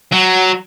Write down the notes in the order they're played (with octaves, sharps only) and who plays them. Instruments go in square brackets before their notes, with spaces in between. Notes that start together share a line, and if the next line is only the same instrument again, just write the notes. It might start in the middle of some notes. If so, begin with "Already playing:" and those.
[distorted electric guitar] F#3